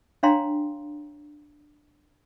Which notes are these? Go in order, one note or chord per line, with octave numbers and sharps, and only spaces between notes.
D4 C#5 F5 G5 A#5 C6